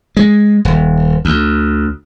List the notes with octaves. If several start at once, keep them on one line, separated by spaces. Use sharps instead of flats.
G#3
D#1
D2